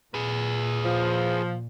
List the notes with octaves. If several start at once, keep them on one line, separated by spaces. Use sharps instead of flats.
A#2 G#4 B4
F3